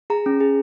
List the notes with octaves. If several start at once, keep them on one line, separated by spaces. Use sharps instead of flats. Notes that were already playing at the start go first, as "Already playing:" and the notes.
G#4 A#5
C#4
G#4